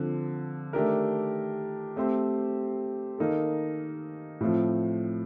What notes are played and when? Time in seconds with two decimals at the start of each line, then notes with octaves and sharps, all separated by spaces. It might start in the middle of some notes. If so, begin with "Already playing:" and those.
Already playing: D3 F3 C4
0.73 D#3 A3 D4 G4 A#4
1.96 A3 C4 G4 C5
3.18 D#3 A#3 D#4 A4
4.41 A2 F3 C4